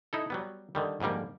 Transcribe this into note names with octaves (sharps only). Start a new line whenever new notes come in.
D#4 E4 A4
F#3 G3 B3
D3 D#3 G3
F2 G#2 D3 G3 A#3